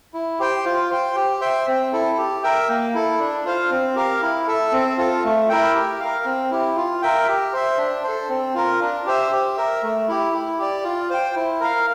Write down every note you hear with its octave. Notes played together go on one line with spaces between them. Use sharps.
E4
G4 C5 G5
F4
C5 G5
G4
C5 E5 G5
C4
E4 A4
G4
A#4 E5 G5
A#3
E4 A4
D4
F4 C5 F5
C4
G4 A#4 F5
E4
A4 E5
C4
F4 A4
A3
E4 A#4 E5 G5
G4
A#4 F5
C4
E4 G4
F4
A#4 E5 G5
G4
C5 E5
D4
A4 C5
C4
F4 A#4
D4
G4 C5 E5
G4
A#4 E5
A3
E4 G4
E4
G4 D5
F4
C5 G5
E4
A#4 F5